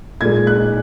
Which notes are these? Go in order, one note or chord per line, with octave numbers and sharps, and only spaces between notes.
A#2 G#3 G#6
F#6